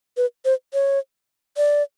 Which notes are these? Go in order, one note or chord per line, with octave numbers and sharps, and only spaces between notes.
B4
C5
C#5
D5